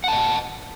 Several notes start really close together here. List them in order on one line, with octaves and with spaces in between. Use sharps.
F#5 A5 D#5